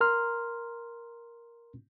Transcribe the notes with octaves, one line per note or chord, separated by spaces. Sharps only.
A#4 A#5 C6 F6